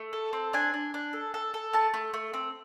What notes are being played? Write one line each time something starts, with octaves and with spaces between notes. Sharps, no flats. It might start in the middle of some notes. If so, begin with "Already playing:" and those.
Already playing: A3
A4
C4
D4 G#5
D4
D4
A4
A4
A4
A3 A5
A3
A3
C4